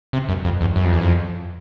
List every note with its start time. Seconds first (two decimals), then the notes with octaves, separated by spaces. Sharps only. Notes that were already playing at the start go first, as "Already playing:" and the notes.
0.13 C3
0.29 F#2
0.44 F2
0.61 E2
0.76 F#2
0.84 F2
0.93 E2
1.01 F2